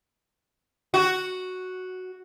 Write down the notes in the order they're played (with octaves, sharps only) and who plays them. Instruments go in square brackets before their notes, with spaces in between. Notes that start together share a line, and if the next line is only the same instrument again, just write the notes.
[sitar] F#4